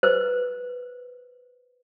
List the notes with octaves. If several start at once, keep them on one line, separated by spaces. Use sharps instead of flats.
B4 C5